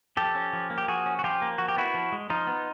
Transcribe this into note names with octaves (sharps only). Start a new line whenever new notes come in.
F3 G4 A4
C#4
F3
A#3
G4
F3 F#4 G#4
C#4
F#4
F3 F4 G4
A#3
F3 F#4
G4
B3 E4 F#4
F3
G#3
F3 D#4 F4
B3